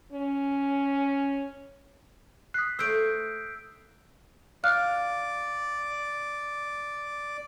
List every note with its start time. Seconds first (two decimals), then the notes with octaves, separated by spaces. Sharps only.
0.13 C#4
2.54 D#6 F#6 B6 C7
2.79 A3 C5 E6 G6 D7
4.64 D5 F5 F6 F#6